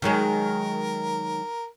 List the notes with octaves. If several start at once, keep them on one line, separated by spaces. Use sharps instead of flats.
D#3 F#3 G#3 A#4